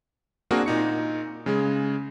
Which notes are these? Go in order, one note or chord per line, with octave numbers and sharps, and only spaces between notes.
A#3 C4 D4 F#4 G#4 A#4
A#2 D#4 C#7
C#3 G#3 G#4